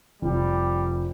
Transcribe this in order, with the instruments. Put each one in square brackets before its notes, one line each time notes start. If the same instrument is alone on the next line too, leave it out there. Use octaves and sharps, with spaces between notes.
[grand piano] F1 [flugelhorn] G3